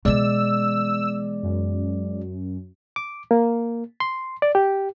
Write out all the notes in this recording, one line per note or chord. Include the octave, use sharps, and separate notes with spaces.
B2 E3 G#3 D5 E6
F#2
D6
A#3
C6
D5
G4